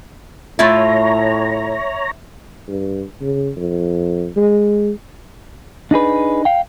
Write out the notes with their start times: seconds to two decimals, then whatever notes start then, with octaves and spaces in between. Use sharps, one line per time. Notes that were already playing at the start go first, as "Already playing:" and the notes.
0.59 A2 A3 E4 F4 C#5 E5 A#5
2.68 G2
3.22 C#3
3.57 F2
4.36 G#3
5.91 D4 D#4 G#4 B4
6.45 F5 G5